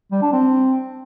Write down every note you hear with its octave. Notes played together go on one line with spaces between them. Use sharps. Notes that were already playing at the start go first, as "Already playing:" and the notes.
G3
D4
C4